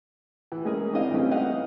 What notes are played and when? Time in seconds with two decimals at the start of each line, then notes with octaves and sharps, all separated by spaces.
0.52 E3
0.65 G#3 C#4 G#4 A#4
0.93 C4 D4 E4 D#5 F5
1.11 E3 G3 A3 C4 C#4
1.31 B3 D#4 D#5 F5 F#5